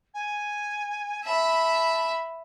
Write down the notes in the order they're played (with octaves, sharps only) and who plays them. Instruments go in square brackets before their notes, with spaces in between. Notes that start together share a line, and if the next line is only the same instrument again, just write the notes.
[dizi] G#5
[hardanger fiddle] E5 B5 [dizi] A5